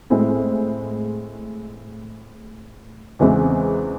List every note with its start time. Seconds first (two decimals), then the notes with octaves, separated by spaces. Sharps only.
0.10 A2 G#3 C4 E4 G#4
3.19 E2 C#3 E3 G#3 C4